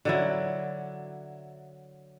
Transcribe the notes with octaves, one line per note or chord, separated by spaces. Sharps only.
D3 F#3 E4